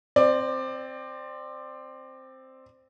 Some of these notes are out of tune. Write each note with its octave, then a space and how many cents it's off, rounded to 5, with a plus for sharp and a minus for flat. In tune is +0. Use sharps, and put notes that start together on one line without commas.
C4 +0 D5 +20